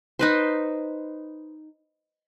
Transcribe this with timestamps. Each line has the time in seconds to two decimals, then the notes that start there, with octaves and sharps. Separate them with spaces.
0.19 D#4 B4 C5